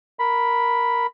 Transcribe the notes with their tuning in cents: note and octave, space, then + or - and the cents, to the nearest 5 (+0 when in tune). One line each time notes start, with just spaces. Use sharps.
A#4 +0 B5 +0